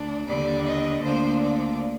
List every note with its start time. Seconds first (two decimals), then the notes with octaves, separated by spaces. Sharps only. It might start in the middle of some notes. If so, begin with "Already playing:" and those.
Already playing: D2 D4
0.26 D#2 D3 G3 D5
0.64 D#5
1.02 D2 D3 F3 A#3 D4 C5
1.40 D5